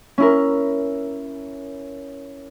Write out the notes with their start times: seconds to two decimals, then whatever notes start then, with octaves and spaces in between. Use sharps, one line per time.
0.18 C#4 E4 A#4